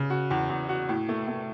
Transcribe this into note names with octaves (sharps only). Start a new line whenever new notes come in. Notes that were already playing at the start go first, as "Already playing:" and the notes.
Already playing: C#3
F#4
E2
E2
F#4
A2
A3
A3